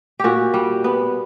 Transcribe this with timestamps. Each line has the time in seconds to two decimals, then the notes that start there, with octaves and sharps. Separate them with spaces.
0.20 A#2 F#4 G4
0.54 G3
0.84 B3